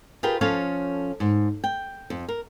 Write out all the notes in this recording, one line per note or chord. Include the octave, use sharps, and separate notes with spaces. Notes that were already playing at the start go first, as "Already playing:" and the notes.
F4 G4 G#4 A#4 B4 G5
F3 C#4 A4 C#5 F5
G#2
G5
F2
A#4